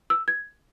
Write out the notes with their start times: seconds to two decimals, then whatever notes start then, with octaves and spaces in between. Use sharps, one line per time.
0.10 E6
0.28 G#6